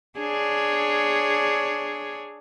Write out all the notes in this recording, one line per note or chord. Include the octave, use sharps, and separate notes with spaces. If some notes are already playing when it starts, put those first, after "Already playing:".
D4 G#4 C#5